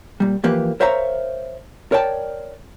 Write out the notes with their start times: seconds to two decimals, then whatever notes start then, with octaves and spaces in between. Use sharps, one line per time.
0.20 A#2 G3
0.44 E3 F3 A#3 G4 B4
0.80 A#4 C5 C#5 E5 F5 A#5
1.92 A#4 C#5 D5 G5 A5